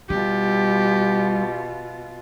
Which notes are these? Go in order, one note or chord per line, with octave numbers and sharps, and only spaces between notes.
B2 G3 F4 G4